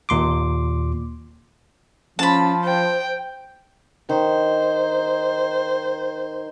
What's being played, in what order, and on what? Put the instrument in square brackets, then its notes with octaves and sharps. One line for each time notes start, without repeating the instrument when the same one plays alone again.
[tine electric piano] D#2 A#2 C6 D6
[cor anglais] F3 [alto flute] C#4 [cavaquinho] A5 B5
[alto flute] C5 [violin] G5
[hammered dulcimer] D#3 [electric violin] C5